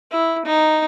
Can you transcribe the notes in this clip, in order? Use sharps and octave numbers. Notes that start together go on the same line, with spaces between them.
E4
D#4